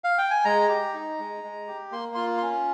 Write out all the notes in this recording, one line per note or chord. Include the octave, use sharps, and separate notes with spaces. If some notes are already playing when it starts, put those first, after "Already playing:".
F5
G5
G#5
G#3 A#5
G4
D#4
G#3
G#3
G4
A#3 C6
F4 C6
C#4 C6